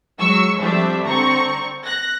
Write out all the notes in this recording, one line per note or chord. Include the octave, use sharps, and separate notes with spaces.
F#3 G#3 C#6 E6
F3 G3 A3 C4 D4 E5
D3 C4 A#5 C#6
F#6 A#6